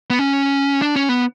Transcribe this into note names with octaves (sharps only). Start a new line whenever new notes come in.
B3
C#4
D4
C#4
B3